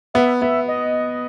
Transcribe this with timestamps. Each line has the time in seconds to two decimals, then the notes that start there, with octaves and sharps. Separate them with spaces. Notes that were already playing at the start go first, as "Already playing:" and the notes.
0.14 B3 E5
0.41 B3 E5
0.68 D#5